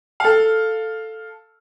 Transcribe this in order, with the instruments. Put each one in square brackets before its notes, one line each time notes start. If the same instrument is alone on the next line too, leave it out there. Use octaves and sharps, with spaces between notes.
[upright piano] A4 F5